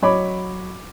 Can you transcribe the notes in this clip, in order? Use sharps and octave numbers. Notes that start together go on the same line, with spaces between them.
F#3 C#5 D#5 B5 D6